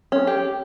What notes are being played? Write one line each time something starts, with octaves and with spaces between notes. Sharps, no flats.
C#4
G4